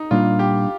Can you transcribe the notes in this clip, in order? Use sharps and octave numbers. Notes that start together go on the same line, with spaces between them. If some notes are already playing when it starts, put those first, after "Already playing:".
Already playing: D#4
A#2 G3 A#3 D4 F4
G4